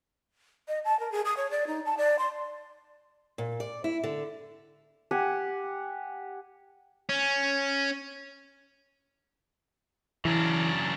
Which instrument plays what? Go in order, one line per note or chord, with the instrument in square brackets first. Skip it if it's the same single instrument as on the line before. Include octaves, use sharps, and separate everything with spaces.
[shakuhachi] D#5
A5
A#4
G#4
D#6
C#5
D5
D#4
A5
D5
C6
[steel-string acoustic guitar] A#2
D5
E4
D3
[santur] G4 F#5 G#5
[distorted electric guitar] C#4
[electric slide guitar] C#3 F#3 D4 [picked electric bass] E3